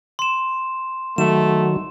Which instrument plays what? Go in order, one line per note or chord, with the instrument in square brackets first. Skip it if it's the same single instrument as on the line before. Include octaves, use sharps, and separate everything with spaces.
[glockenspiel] C6 E7
[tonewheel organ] D#3 F#3 [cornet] A3 [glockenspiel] E7